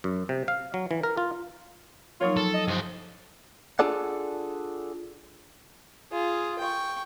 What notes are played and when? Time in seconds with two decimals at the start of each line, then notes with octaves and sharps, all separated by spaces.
0.04 F#2
0.29 C3
0.48 F5
0.74 F#3
0.91 E3
1.03 A#4
1.17 F4
2.21 F3 F#3 A#3 D#4 F4 C#5
2.37 A4
2.54 D#5
2.68 G2 F3 C5
3.79 D4 F4 G#4 A4 D5 F#5
6.12 F4 G#4
6.59 G5 C#6